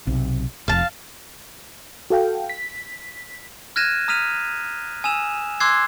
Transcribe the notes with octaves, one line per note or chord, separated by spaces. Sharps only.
B1 C3
F1 F2 F5 A5
F#4 A4 F5 G5
B6
F6 F#6 G#6 A#6 D#7 E7
A#5 D#6 F6 B6 D#7 F7
G#5 D#6 E6 E7 F7
C6 D6 E6 F#6 G#6 C7